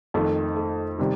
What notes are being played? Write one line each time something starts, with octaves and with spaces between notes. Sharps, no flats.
F2 D#3 A3
A3
C3 D#3 G3